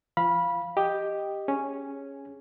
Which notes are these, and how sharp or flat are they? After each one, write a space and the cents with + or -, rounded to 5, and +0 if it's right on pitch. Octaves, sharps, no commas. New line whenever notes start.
F3 -30 F5 +0 B5 -15
G4 +0 D#5 +0
C#4 +0 G#4 +0